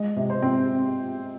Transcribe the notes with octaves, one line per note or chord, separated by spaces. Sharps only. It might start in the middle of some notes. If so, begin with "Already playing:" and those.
Already playing: G#3 D#5
C3
C5
C4